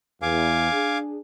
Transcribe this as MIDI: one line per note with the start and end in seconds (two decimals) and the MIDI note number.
0.22 0.72 40
0.22 0.98 77
0.22 0.98 80
0.22 0.98 86
0.72 1.18 62
0.72 1.18 68